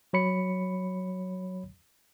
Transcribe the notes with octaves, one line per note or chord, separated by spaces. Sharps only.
F#3 C#5 B5 C#7